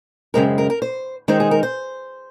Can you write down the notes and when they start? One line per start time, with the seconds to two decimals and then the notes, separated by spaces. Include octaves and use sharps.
0.34 F#2 C#3 G#3 C4 A#4
0.58 A#4
0.70 A#4
0.82 C5
1.28 D#3 G#3 C4 D#4 C5
1.40 G#4
1.51 A#4
1.63 C5